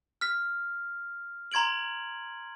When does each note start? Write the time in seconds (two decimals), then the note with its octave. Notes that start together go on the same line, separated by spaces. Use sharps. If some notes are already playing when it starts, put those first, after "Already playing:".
0.21 F6 B6
1.52 A#5 C6 G#6 D7 F#7